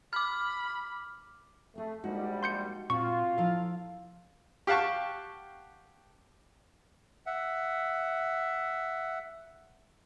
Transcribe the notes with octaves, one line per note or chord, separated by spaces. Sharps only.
B5 D6 F6
A3 C4 G#4
A#1 G3 G#3 D#4 F#4 F#5
C6 G6 C#7
A#2 C4 F4 F#4 C#6
F3 E4 A4 F5 A#5
G4 F5 F#5 A5 C#6
E5 F#5